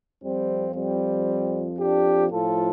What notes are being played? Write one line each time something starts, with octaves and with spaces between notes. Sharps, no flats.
F2 F3 G3 C4
G3 C4
D4 G4
A2 F3 F4 A4